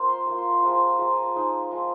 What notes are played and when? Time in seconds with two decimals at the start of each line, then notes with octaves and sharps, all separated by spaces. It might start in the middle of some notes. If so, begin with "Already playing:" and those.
Already playing: A#3 F4 C5
0.09 C6
0.26 A#3 F4 A#5
0.38 C6
0.50 A#5
0.62 F3 G#3 F4 A#5
0.74 G#5
0.87 G#5
0.98 F3 G#3 F4 A#5
1.11 G#5
1.23 A#5
1.35 F3 G#3 D#4
1.71 F3 G#3 D#4